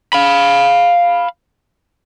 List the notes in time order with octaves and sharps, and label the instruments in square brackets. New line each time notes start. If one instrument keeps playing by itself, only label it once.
[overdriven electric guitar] F5 B5